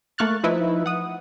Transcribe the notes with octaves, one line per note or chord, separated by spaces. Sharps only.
A3 A#3 C#6 F6 F#6 A6
F3 D#4 E4 B4 E5
F#5 D#6